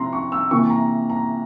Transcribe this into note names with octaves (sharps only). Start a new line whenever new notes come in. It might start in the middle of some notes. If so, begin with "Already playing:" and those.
Already playing: C3 F3 C4 E4 A#5 C6
C#6
E6
C3 E3 A#3 E4 C#6
A#5
A#5